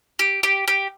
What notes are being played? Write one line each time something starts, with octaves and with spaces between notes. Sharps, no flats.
G4
G4
G4